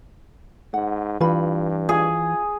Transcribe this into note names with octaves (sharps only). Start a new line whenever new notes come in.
G#2 F#5
G2 E3 F4 B5
F4 G#4